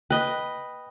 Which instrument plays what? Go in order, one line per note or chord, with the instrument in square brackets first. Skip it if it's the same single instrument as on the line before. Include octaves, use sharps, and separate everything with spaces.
[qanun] B4 D#5 [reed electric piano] G5